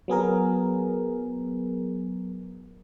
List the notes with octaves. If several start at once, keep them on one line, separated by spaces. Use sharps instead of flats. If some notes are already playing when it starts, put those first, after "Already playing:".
F#3 B3 G#4 A#4